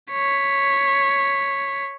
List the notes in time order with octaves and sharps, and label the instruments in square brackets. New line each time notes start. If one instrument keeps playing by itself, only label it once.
[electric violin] C#5 B6